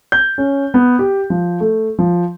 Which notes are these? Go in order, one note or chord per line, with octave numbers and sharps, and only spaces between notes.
G6
C#4
B3
G4
F3
A3
F3